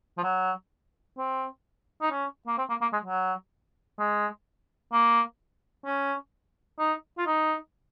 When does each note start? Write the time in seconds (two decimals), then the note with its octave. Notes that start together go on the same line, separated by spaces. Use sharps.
0.18 F3
0.24 F#3
1.18 C4
2.01 D#4
2.11 C#4
2.47 A#3
2.58 C4
2.70 A#3
2.81 A#3
2.93 G#3
3.05 F#3
3.99 G#3
4.93 A#3
5.86 C#4
6.79 D#4
7.18 F4
7.27 D#4